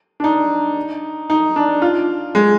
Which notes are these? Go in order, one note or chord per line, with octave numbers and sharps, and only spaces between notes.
D4
D#4
D#4
D4
F4
G#3